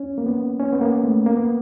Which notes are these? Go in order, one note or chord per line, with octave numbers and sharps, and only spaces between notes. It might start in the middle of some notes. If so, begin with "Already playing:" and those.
Already playing: C#4
A#3
B3
C#4
B3
A#3
A3
A#3
B3